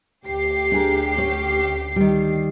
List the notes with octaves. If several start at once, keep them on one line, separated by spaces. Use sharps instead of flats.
D2 G4 C7
D4 G#4 A#4
C#4
D#3 G3